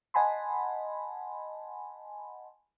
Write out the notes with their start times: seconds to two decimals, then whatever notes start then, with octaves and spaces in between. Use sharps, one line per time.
0.14 D#5 F#5 G#5 A5 B5 C6